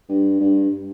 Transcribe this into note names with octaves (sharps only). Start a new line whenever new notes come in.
G2
G2